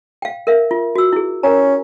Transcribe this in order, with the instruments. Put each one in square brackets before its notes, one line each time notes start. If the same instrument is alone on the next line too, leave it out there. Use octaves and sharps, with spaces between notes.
[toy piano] F5 G5
A#4 E5 F5
F4
F#4 E6
E4 G#4
[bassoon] C#4 [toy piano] A#4 G5 A#5